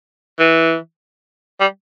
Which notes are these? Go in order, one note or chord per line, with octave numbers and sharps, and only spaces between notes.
E3
G3